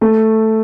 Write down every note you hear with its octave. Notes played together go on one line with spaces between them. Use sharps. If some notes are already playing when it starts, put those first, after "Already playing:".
A3